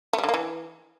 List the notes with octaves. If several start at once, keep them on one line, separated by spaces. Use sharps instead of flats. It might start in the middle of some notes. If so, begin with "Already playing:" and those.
A3
G3
D3
A#3
E3